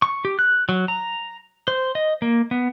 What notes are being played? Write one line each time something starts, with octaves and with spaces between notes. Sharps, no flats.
C#6
G4
F#6
F#3
A#5
C5
D#5
A#3
B3